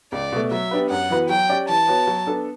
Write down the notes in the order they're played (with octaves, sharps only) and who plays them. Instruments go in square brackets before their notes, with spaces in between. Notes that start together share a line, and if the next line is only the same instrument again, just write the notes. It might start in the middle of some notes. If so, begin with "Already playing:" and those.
[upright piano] C#2 [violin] D5
[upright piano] B2 A3
[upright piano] F#3 [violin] E5
[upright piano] B3 D4 G4 B4
[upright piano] F#2 [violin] F#5
[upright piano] E3 B3 F#4 B4
[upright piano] F#3 [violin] G5
[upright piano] C#4 G4 D5
[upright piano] E3 [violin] A5
[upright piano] B3 F#4 C#5
F#3
B3 D4 A4